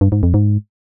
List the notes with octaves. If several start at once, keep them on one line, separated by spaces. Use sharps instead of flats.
G2
G#2
F2
G#2